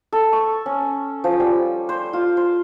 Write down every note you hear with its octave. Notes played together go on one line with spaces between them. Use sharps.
A4
C#6
C#4
F3
G3
C5
F4
C5